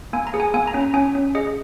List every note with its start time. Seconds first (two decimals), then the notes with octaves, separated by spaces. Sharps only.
0.13 A#3 G#5
0.27 A#5
0.34 G#4
0.40 G#5
0.54 A#3 G#5
0.67 A#5
0.74 C#4
0.81 A#5
0.94 C#4 G#5
1.15 C#4
1.35 G#4 D#5